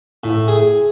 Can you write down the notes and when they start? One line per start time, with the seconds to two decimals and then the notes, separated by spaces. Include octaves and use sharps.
0.24 A2
0.48 G#4